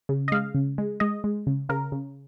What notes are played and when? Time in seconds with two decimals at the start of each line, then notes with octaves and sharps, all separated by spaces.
0.09 C#3
0.28 D#5
0.32 G#3 F5
0.54 C#3
0.78 G#3
1.00 G#3 D#5
1.24 G#3
1.47 C#3
1.69 C#3 A#4
1.92 C#3